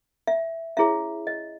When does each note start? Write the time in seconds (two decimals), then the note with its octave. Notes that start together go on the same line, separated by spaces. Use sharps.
0.27 E5
0.77 C#4 E4 G#4 C#5 E5
1.27 D#5